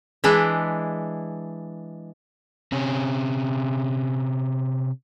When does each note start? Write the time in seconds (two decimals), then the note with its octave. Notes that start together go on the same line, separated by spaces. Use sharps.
0.24 E3 G#3 D4 E4
2.72 C3 C#4